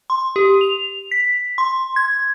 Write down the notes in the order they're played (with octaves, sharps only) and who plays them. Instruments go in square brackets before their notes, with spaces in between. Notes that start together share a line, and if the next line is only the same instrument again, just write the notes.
[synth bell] C6
G4
F7
B6
C6
G#6